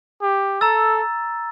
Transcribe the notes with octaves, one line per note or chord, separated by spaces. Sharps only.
G4
A4 A#5 E6 A6